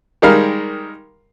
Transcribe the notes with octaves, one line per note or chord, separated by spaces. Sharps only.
D#3 G3 G#3 A#4 F5 F6